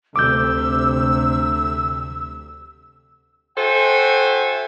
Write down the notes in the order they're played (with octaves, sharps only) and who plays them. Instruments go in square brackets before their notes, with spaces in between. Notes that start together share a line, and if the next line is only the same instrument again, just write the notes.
[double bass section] D2 C3 [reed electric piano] D6 G6 [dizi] E6
[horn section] F#4 A4 C5 E5 G5 G#5